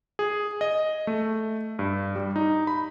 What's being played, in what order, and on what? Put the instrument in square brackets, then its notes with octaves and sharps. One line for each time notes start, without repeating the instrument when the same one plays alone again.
[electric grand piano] G#4
D#5
A3
G2
G3
D#4
B5